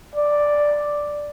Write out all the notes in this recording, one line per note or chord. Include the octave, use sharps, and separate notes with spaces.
D5